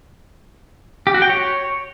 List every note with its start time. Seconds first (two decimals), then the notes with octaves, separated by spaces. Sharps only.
1.07 G4
1.14 F#4
1.22 G5
1.30 C#5